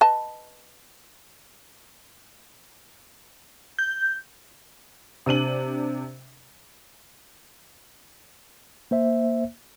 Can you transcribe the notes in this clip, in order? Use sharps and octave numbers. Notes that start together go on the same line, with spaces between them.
B4 D#5 A5
G6
C3 D4 D#7 F#7
A#3 C5 E5